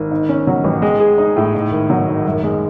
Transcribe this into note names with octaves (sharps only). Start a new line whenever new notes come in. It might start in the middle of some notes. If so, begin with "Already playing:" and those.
Already playing: G#1
G#2
C#4
F#3
A1
G#3
G#4
D#4
A2
G#2
G#1
F#3
G#1
F#2
G#3